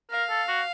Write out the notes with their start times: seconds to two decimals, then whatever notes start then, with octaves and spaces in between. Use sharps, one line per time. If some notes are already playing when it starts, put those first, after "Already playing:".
0.11 A#4 F5
0.29 A4
0.48 F#4